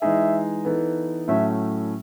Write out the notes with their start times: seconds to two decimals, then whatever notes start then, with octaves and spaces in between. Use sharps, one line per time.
0.02 E3 G#3 D#4 G#4 E5
0.65 E3 B3 D#4 A4
1.28 A2 F#3 A3 C#4 E5